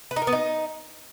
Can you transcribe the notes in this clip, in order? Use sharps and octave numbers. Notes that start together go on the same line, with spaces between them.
B4
D#4
A#4
B3
D#4